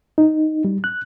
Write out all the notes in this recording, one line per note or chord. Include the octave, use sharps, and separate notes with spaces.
D#4
G3
F#6